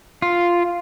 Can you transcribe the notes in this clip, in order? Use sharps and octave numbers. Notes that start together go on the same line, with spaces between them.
F4